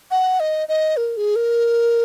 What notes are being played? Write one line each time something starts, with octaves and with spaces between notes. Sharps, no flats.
F#5
D#5
D#5
A#4
G#4
A#4